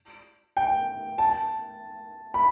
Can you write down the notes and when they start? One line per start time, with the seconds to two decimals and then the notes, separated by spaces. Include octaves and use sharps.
0.57 G5
1.18 A5
2.34 B5